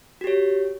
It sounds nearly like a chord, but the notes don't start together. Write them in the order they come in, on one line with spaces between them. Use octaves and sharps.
F#4 G4 C#5